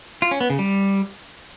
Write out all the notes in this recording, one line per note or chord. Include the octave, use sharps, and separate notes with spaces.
F4
C#4
B3
C#3
G3